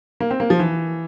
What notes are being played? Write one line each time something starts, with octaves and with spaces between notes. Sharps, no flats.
A#3
C4
A#3
F3
E3